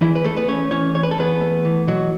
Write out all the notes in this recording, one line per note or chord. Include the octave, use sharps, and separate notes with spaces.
E2 E3 E4
B4
E2 A3 A4
B3 B4
A3 C#4 C#5
E3 C#4 C#5
E2 C#5
B4
A4
E2 B3 B4
A3
E3
B2 F#3 F#4